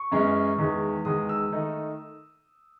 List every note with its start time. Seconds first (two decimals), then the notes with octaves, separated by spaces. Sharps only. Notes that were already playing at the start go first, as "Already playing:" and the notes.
Already playing: C#6
0.12 F#2 E3 G#3 C#4
0.58 E2 D#3 G#3
1.05 E2 D#3 G#3 D#6
1.29 E6
1.52 D#3 A3 D#4